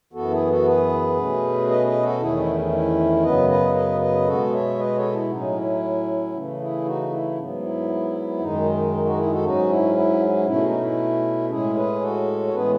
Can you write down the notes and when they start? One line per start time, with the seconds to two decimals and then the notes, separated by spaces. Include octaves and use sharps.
0.13 F#2 E3 B3 F#4 A4
0.31 E4 G#4
0.48 F#4 A4
0.65 G#4 B4
1.17 B2 A3 C#4
1.68 B4 D#5
1.85 B4 D#5
2.03 F#4 A4
2.20 E2 D#3 A3 C#4 E4 G#4
2.38 E4
2.71 E4
3.23 F#2 C#3 F#3 B3 B4 D#5
3.50 B4 D#5
3.75 B4 D#5
4.01 B4 D#5
4.27 B2 G#3 B3 F#4 A4
4.53 C#5 E5
4.79 B4 D#5
4.96 A4 C#5
5.13 E4
5.30 A2 F#3 C#4 D#4
5.56 E4
6.34 C#3 E3 A3
6.60 E4 G#4
6.85 D#4 F#4
7.11 E4
7.37 G#2 F#3 B3
7.63 E4
8.40 F#2 D#3 G#3 D#4
8.92 D#4
9.05 D#4 F#4
9.17 E4 G#4
9.31 F#4 A4
9.43 G#2 F#3 C#4 D#4 F#4
9.69 E4
9.96 E4
10.47 B2 A3 C#4 E4
10.64 D#4
10.82 E4
11.50 A2 G#3 C#4 E4 G#4
11.76 G#4 B4
12.01 F#4 A4
12.47 C#5
12.53 A2 E3 G#3 B3 G#4 B4